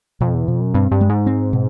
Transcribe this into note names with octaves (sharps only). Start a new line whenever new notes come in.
F2 B2
E2
F2 B2
F#2
G2 C4
G2
G#3
G#2
C4
B2